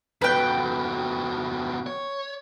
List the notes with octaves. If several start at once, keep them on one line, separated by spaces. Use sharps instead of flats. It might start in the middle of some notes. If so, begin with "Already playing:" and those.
F2 B2 B4 G5
C#5